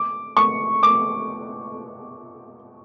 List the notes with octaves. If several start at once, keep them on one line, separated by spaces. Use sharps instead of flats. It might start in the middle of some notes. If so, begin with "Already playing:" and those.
Already playing: D6
C#6
D6